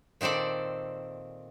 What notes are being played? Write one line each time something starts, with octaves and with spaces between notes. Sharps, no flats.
A#2 D#3 C4 A4 D5